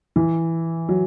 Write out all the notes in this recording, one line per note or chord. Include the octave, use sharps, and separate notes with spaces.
E3
F#3